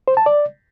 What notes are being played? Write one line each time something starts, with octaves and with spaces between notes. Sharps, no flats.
C5
A5
D5